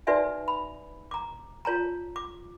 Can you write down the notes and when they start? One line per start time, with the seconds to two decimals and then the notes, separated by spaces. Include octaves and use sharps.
0.07 D#4 F#4 B4 D5 E5 G#5
0.48 B5
1.11 A#5 D6
1.65 F4 C#5 A5 A#5
2.16 D6